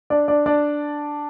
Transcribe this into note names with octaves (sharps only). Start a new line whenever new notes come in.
D4 D5
D4 D5
D4 D5